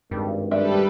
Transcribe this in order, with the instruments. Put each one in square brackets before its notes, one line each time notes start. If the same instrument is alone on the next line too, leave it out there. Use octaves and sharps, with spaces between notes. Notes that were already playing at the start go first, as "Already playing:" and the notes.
[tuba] G#1 [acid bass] G2
[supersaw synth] G3 A4 B4 [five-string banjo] G#3 D4 E5